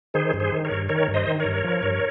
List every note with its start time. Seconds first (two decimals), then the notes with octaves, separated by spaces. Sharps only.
0.14 D#3 G#4 C5
0.34 G2
0.40 G#4 C5
0.52 D#3
0.65 A#4 C#5
0.71 G2
0.89 D#3 A#4 C#5
1.08 G2
1.14 C5 D#5
1.27 D#3
1.40 A#4 C#5
1.45 G2
1.64 F3
1.83 G2